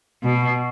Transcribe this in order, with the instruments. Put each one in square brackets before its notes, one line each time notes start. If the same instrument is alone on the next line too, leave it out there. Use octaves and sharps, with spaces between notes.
[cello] B2